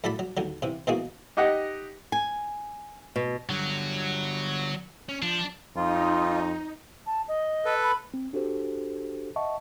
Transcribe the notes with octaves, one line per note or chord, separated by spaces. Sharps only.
A2 F#3 A4 D5 B5
F#3
D#2 D3 F#3
C3 E3
B2 E3 G#3 A#3 F#4 G#4
D#4 G4 D#5 F#5
G#5
B2
D3 F#3 G3
C#4
F3 D4
F2 D#4 F4
A5
D#5
A4 B4
B5
C4
D4 F#4 G4 A4 C5
D#5 E5 F#5 A5 C#6